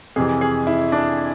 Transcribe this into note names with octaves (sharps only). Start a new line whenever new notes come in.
F2 C3 E3 G#4
G#4
E4
D4